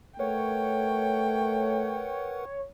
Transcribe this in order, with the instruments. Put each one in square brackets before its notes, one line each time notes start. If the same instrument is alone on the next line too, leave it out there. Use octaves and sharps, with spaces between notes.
[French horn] A3 [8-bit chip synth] A#4 B4 F#5 [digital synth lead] C#5 [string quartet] G5